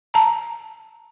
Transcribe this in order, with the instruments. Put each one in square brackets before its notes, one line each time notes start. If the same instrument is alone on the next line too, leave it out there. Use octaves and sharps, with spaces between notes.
[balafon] A5 A#5